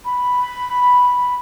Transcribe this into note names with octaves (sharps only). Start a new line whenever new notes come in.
B5